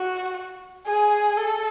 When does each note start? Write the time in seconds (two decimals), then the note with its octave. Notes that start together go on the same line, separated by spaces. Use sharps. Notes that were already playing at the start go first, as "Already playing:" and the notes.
Already playing: F#4
0.86 G#4
1.37 A4